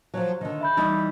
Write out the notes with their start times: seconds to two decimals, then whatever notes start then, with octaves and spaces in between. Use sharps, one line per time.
0.14 F3 F#3
0.41 D3 D#3
0.61 E5 B5 G6
0.77 E3 G3 D#4